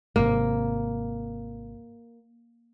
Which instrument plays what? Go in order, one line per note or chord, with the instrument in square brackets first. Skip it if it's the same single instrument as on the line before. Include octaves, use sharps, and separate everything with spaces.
[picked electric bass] G#1 C3 [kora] A#3